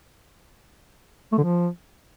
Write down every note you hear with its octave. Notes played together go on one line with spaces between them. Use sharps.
A3
D3
F3